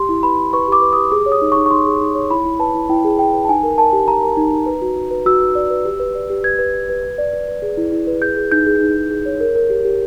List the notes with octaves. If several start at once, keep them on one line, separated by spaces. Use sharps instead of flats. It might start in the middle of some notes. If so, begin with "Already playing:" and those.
Already playing: G4 C6
E4
B4 B5
E4
B4 C#6
G4 D6
B4
G4 D#6
G#4 D6
C#5
D#6
D#4
D#4 C#6
C#6
D#4 C6
G#4
D#4
C#5
E4 B5
E4
B4 A5
E4
E4 G5
G#4
E4 G5
B4
A5
D#4 G#5
A#4
A#4 A5
G4
G4 A#5
A#4
D#4
D#4
B4
F#4
F#4
B4
F#4 E6
B4
D5
B4
G4
B4
D5
G4
B4 G#6
B4
B4
B4
B4
D5
B4
B4
G#4
E4
E4
B4
G#4 G6
G#4
D#4 G6
G#4
D#4
G#4
G#4
C#5
A#4
A#4
G4
G4